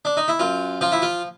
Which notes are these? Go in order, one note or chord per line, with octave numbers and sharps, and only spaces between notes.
D4
D#4
E4
F#2 F4
F3 F4
E4
F4